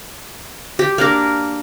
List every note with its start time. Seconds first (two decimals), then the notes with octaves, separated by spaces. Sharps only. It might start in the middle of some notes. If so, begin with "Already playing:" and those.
0.79 G4
0.98 A#3 D4 A#4